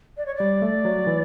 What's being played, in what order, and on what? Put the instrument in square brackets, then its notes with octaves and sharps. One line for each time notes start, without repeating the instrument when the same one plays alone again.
[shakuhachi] D5
C#5
[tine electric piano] G3 [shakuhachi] D5
[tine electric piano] A3
F#3
E3